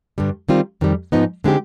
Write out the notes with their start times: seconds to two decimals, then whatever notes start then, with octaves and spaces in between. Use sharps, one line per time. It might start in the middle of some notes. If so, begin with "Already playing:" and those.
0.18 G2 D3 G3
0.49 D#3 G3 C4 F4
0.81 F2 D#3 G3
1.12 G#2 F3 B3 D#4
1.44 D3 G#3 C4 D#4 G4